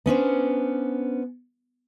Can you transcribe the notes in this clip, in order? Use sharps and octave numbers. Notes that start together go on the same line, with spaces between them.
B3 C#4 D4 C5